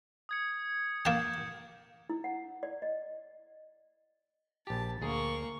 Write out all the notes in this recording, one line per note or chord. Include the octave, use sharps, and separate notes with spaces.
D#6 G#6 C#7
A#3 A5 G6
E4
F#5
D5
D#5
A#1 G4 A5
D2 A#3 G#4 C#6